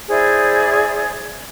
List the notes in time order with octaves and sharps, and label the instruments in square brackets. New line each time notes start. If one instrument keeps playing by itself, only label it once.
[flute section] E4 G#4 C5 D5